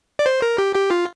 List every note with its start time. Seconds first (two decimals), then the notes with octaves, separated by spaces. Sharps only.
0.19 D5
0.26 C5
0.42 A#4
0.58 G4
0.75 G4
0.91 F4